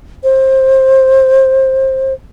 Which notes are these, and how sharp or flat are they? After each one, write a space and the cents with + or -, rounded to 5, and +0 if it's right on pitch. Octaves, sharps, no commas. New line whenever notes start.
C5 +20